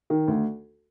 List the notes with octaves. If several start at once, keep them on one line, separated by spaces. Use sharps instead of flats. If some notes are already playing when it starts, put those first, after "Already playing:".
D#3
D2